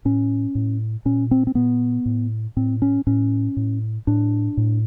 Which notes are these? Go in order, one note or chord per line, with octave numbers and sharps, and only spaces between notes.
A2 C#4
A2
A#2 C#4
C4
C4
A#2 B3
A2
A2 C4
C#4
A2 C#4
A2
A2 D4
A2